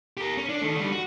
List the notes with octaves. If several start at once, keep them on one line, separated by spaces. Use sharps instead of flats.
G4 A#4
C#4
D4
D#3 A3
D3 G3
F#4